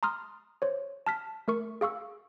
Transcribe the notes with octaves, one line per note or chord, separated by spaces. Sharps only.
A#5 C6 D#6 F6
C5 C#5
A5 F6 B6
A3 A#4 C#6
G#4 F5 C#6 E6